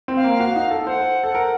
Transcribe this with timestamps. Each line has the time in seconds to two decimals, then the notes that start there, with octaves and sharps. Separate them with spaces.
0.08 C4
0.16 F5
0.24 A#3
0.40 F#4
0.56 D#4
0.71 A4
0.87 C5 F#5
1.24 A4
1.35 A#4